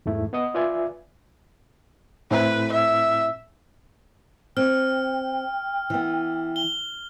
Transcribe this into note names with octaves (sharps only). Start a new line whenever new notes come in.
E2 G#2 A3 E4
B3 D#5 D#6
F4 B4 D5 E5 G#5
A2 C4 E4 B4
E5
C4 G5 F6
E3 B3
G7